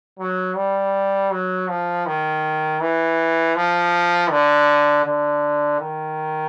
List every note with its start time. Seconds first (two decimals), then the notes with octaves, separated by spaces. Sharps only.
0.19 F#3
0.56 G3
1.31 F#3
1.68 F3
2.06 D#3
2.81 E3
3.56 F3
4.31 D3
5.05 D3
5.80 D#3